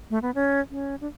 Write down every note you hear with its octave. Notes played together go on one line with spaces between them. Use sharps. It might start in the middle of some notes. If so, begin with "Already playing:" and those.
A3
B3
C#4
C#4
D4